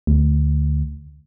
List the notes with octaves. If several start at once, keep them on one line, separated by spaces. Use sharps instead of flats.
D2